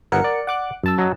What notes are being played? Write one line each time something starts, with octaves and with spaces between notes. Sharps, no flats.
G1 B3 E4 A#4 F#5 C#7
D5
F#5 D6 F#6
F#2 A5 E6
F#3 D#5